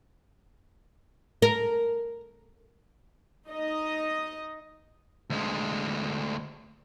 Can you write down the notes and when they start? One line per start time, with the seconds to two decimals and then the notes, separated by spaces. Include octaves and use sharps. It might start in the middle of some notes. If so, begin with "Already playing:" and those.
1.42 A#4
3.49 D#4 D#5
5.30 D2 G#3